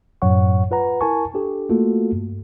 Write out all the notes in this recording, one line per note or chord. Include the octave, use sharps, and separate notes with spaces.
F#2 A2 F#3 C#5 F#5 C#6
F4 B4 F#5 A#5
E4 A#4 G#5 A5 C#6
D4 G4 A4
A3 A#3 F4 F#4 A4
G2